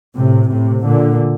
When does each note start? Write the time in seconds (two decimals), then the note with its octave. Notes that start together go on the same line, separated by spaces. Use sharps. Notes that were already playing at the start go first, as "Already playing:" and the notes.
0.15 A2 C3
0.50 A2 C3
0.85 A#2 D3